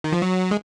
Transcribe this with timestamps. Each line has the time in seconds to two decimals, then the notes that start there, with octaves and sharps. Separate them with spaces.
0.04 D#3
0.12 F3
0.22 F#3
0.51 G#3